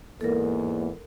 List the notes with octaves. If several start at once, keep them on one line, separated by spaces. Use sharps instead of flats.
E2 G#2 A#3 A4 A#4